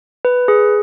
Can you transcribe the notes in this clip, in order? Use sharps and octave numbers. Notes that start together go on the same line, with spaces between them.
B4
G#4